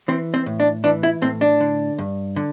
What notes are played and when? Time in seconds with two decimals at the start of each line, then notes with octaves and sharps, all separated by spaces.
0.08 E3 C4
0.34 C4
0.46 A2
0.60 D4
0.84 E3 D4
1.03 E4
1.22 A2 C4
1.41 D4
1.61 D3
1.98 G2
2.36 D3